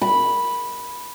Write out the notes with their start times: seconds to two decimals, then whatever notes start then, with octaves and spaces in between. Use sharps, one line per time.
0.02 B5